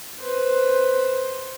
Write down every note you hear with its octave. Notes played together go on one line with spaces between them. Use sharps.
B4 C5